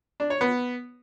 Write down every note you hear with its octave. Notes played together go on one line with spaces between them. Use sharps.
D4
C#5
B3